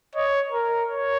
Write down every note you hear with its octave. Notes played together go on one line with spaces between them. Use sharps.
C#5 D#5
A#4
C#5